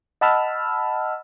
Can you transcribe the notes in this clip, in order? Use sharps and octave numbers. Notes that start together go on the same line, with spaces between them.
D#5 F#5 A5 B5 E6 F6